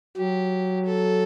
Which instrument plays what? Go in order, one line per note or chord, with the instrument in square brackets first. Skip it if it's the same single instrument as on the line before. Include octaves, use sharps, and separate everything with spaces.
[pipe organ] F#3 [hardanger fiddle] G4
[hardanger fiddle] A4